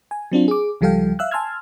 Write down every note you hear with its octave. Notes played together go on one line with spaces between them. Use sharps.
G#5
F#3 C4 D4 F4
G#4 D6
C#2 F3 G3 A4 F5 G5
E5 F5 E6 F#6
G#5 A5 C6 E6 F6 G#6